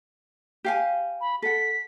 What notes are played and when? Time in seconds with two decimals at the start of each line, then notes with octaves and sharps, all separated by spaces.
0.64 G4 F5 G#5
1.21 B5
1.42 A4 F#5 B6